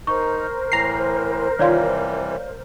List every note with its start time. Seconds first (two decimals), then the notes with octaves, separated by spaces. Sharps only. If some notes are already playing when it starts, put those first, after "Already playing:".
0.07 D#4 A#4 C5 C#6
0.72 A2 E3 A#5 C7
1.59 C3 D#3 E3 G3 F4 C#5 D5 F5